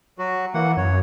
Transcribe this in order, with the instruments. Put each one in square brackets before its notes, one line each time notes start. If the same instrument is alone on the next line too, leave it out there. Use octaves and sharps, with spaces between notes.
[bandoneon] F#3 F#4
[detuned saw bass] E3 [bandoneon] A#3 F#5
[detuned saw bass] F#2 [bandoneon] C#5